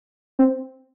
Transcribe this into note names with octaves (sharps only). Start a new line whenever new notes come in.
C4